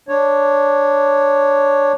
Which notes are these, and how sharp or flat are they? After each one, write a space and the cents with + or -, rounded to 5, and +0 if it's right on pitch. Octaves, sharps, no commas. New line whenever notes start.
D4 +0 C#5 +0